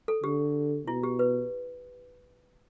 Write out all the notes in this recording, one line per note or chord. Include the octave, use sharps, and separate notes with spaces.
A4
D3 G4
B2 E4
G4
B4